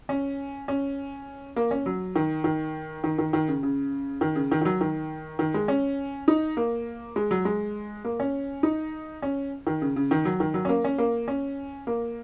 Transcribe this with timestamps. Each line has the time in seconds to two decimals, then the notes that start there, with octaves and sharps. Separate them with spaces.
0.09 C#4
0.68 C#4
1.56 A#3
1.71 C#4
1.86 F#3
2.16 D#3
2.44 D#3
3.04 D#3
3.19 D#3
3.33 D#3
3.48 C#3
3.63 C#3
4.21 D#3
4.36 C#3
4.51 D#3
4.62 D#3
4.65 F#3
4.81 D#3
5.39 D#3
5.54 G#3
5.68 C#4
6.28 D#4
6.57 A#3
7.16 G#3
7.31 F#3
7.45 G#3
8.05 A#3
8.20 C#4
8.63 D#4
9.22 C#4
9.67 D#3
9.82 C#3
9.96 C#3
10.11 D#3
10.25 F#3
10.40 D#3
10.54 F#3
10.65 C#4
10.69 A#3
10.84 C#4
10.98 A#3
11.28 C#4
11.87 A#3